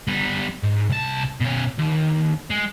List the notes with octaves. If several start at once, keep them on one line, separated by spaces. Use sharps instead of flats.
G3 B3
G#2
C2 A5
B2 C#4
D#2
G#3